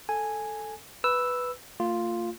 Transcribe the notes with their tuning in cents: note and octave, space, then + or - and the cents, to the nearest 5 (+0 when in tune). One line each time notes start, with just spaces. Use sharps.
A4 +0 G#5 +0
B4 +0 E6 +0
A3 +45 F4 +0